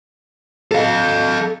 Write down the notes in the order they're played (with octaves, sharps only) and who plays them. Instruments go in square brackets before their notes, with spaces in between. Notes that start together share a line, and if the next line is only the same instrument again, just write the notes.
[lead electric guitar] A4 F5